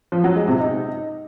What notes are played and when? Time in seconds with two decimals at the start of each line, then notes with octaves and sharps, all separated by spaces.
0.12 F3
0.24 F#3
0.36 G#3
0.48 C3
0.60 D#4